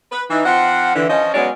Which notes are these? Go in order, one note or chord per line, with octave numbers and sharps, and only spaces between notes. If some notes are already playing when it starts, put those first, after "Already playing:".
B4
E3 D#4
F3 C4 F4 F#5
D3 E3
F3 C#4 D#5
F#3 G#3 B3 C#4 C#5 D5